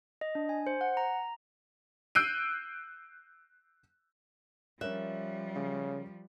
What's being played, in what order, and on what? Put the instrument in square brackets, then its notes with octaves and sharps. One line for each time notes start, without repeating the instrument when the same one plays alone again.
[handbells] D#5
D4
G#5
C5
F#5
A#5
[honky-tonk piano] E6 F#6 G6 C7 D7 D#7
[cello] F3 G3 [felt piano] C#4 A#4 F#6 [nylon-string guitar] E5
[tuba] C#3